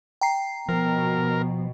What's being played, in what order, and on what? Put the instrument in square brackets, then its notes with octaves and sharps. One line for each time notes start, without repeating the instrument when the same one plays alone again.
[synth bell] G5 A#5 C7
[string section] B2 [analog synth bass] F3 [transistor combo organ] A#4